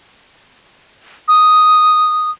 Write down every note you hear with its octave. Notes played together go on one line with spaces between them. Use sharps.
D#6